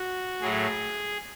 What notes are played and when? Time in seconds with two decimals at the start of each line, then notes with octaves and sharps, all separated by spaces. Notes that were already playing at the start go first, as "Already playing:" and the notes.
Already playing: F#4
0.41 A2 F#3 A3 G#4